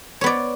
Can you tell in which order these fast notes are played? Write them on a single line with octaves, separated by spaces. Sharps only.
C#5 B3 D5